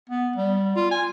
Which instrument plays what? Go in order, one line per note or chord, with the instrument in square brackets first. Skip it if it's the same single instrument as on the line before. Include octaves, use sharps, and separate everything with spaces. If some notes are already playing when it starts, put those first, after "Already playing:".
[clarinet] B3
G3
F4
G#5